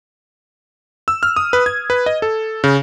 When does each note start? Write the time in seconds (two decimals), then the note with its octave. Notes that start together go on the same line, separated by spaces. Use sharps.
1.08 E6
1.23 F6
1.36 D#6
1.53 B4
1.66 G#6
1.90 B4
2.06 D#5
2.22 A4
2.64 C#3